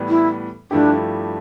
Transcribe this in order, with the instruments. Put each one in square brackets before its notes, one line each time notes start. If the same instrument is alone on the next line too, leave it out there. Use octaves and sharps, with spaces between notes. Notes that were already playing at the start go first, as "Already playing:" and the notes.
Already playing: [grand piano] A2 E3 G3 B3
[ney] E4
[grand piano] G2 F3 A3 E4 G4 [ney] D4